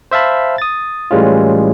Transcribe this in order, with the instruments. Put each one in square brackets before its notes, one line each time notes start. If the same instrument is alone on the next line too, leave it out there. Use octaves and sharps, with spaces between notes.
[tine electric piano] C5 E5 F5 A5 B5
D#6 A6
A2 E3 G3 G#3 C#4 F4